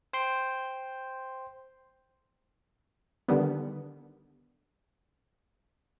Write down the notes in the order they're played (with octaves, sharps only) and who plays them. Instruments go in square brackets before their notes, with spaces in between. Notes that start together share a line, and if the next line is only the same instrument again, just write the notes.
[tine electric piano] C5 G5 C6
[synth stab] D3 D#3 G3 B3